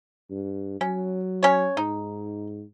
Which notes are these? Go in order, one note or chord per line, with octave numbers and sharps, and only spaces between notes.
G2
F#3 C#4
C#4 C#5
G#2 D#4